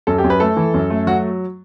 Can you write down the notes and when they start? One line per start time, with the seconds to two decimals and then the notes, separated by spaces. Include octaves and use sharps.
0.07 F#2 A4
0.18 G4
0.24 F#2
0.30 B4
0.40 A3 A4
0.57 E3
0.74 F#2
0.90 A3
1.07 F#3 F#4